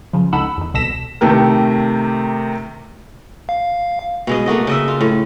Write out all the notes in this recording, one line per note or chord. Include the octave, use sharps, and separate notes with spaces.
C#3 F3
C#2 D#4 A4 F#5 B5 E6
E2 D#3
C2 B2 A4 A#6 B6 E7
C3 D#3 A3 G4 A#4
F5
B2 G#3 D#5
A3 A#3 F#4 D#5
C#3 D#5 E5
F4
A2